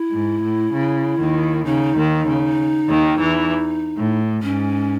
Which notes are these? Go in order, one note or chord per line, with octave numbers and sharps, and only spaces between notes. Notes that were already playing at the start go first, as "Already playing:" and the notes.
Already playing: E4
G#2
A2
C#3
D#2 D#3
C#3 D#4
D#2 D#3
C#3
D#2 D#3
E2 E3
A2
G#2 C#4